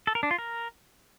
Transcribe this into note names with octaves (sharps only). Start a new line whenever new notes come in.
A4
A#4
D4
F4
A#4